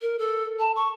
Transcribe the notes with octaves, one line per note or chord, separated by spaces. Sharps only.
A#4
A4
A5
C#6